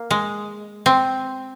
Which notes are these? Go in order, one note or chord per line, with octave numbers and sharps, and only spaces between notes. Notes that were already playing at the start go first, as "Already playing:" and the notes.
Already playing: A#3
G#3
C4